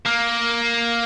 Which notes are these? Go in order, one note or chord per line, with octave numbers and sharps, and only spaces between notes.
A#3